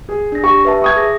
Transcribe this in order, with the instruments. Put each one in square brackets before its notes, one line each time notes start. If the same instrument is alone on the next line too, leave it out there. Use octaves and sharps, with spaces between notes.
[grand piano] G#4
[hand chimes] D4 A#6
[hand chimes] G4 [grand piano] C#6
[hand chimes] B4 E5 A5
[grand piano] C#6 D#6 G#6
[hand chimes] G#4 A#6